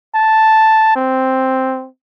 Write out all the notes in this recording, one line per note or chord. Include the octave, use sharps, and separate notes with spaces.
A5
C4